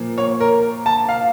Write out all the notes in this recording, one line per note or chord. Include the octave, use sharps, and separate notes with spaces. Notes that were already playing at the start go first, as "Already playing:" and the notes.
Already playing: A#2 F3 A#3
C#5
A#4
A5
F5